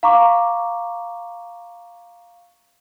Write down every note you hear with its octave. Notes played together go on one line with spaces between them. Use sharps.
F5 A#5 C#6 D6